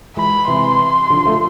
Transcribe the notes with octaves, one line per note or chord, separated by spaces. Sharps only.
E3 G#3 B5
C3 E3 C6
D3 F3
F3 A3